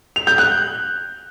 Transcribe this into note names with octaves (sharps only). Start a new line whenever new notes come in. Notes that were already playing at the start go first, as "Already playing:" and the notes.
F7
G6
F#6